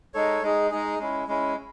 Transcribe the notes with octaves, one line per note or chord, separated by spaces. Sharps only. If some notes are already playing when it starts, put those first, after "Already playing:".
G#3 D#4 A4 C#5
G#3 D#4 G#4
G#3 D#4 G#4
G#3 C#4 E4
G#3 C#4 E4